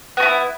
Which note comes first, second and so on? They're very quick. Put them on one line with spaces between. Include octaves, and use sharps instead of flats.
B3 F#4 E4